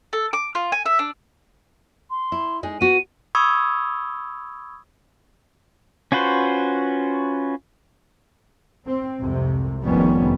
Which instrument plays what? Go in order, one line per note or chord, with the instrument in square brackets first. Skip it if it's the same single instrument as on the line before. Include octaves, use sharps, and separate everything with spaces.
[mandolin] A4
D6
F4
G#5
E5
D4
[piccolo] C6
[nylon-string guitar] E4
G#3 D#4 G#4
[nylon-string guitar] B3 F#4 [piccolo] D#7
[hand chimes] B5 C#6 D#6 E6 G#6
[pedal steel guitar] C#4 F4 F#4 B4 C5
[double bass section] C4
C2 F2 G#2 C3
F1 F2 D#3 G3 B3 C#4